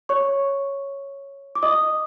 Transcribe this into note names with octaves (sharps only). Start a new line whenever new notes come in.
C#5 C#6
D6
D#5 D#6